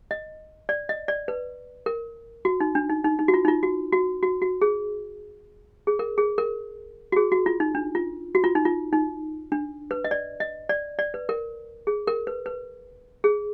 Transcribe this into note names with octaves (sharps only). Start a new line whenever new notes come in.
D#5
D5
D#5
D5
B4
A#4
F#4
D#4
D4
D#4
D#4
D#4
F#4
F4
D#4
F4
F#4
F#4
F#4
F#4
G#4
G#4
A#4
G#4
A#4
F#4
G#4
F#4
F4
D#4
D4
F4
F#4
F4
D#4
F4
D#4
D4
B4
D#5
D5
D#5
D5
D5
B4
A#4
G#4
A#4
B4
B4
G#4